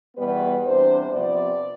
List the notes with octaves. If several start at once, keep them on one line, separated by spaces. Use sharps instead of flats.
E2 B2 G3 B3 B4
E2 C3 G3 D4 C5
C3 F3 B3 D5